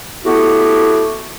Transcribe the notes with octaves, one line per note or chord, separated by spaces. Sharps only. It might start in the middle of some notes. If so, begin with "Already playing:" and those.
A3 B3 E4 F#4 G4